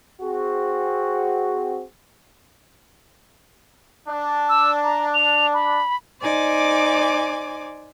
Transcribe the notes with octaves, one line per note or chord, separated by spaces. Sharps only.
C4 F#4 G#4
D4
E6
A#5
F7
B5
D#4 C5 D5 G#5 D6